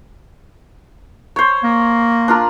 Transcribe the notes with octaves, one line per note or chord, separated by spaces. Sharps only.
C5 C#5
A#3
D4 F4 A#4